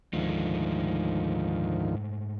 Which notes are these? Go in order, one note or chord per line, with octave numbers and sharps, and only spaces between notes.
D2 G#2 D#3 F3 G#3 A3